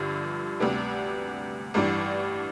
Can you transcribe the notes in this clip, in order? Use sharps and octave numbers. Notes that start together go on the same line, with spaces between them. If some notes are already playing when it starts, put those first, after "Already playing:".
Already playing: G1 G2 D3 F3
D2 C3 G3 B3 D4
A1 G2 E3 G3 D4